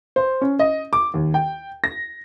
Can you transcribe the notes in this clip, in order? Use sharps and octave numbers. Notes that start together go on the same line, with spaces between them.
C5
C#4
D#5
D6
D#2
G5
A#6